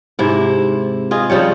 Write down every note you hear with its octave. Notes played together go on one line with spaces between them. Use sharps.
G#2 C3 E4
F4 G#4 D#5
C#3 F3 G3 C#5